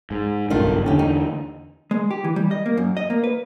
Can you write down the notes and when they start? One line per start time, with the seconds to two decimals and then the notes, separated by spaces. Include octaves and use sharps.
0.11 G#2
0.50 F#1 B1 G2 D#3 A3 F4
0.86 E2 D3 C#4 D4 G4
0.99 D#4
1.91 G#3
2.11 G4
2.24 E3
2.36 G3
2.51 D#5
2.66 A#3
2.77 F#2
2.97 D#5
3.10 A#3
3.24 B4